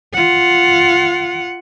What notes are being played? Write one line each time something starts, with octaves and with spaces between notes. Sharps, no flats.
F4 F#5